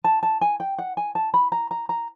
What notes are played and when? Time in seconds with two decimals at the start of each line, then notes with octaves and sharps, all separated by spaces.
0.04 A5
0.23 A5
0.41 G#5
0.60 G5
0.78 F#5
0.97 G#5
1.15 A5
1.34 B5
1.52 A#5
1.71 A#5
1.89 A#5